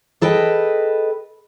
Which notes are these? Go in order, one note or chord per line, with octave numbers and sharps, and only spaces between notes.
G#4 A4 B4 D#5 G5